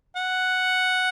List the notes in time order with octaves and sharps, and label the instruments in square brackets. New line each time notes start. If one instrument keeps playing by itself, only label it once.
[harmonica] F#5